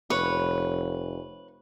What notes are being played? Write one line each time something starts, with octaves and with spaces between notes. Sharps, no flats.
F1 B4 C#5